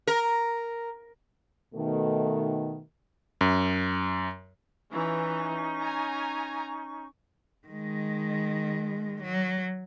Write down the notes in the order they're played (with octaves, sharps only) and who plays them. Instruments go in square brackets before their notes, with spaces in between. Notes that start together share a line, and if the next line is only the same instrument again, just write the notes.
[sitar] A#4
[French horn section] B2 D#3 A3
[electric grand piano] F#2
[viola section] E3 [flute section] C#4 D#4 C#6
[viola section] G#5 A#5
[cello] D#3 G#3
F#3